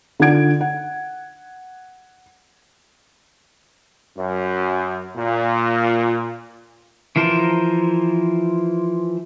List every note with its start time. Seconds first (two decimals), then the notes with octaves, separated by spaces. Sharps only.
0.20 D3 D#4 F4 F#5 G#6 D7
0.61 F#5
4.17 F#2
5.17 A#2
7.16 E3 F3 A#4 C5 A5